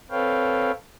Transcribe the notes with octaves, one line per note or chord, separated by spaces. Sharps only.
C4 A4 B4 C#5 F5 G5